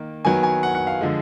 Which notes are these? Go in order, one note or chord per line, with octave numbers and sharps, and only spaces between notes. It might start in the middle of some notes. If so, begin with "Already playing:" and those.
Already playing: D#3 A#3
D#3 F#3 B3 G#5
G#5
F#5
F#5
F5
D3 F3 G#3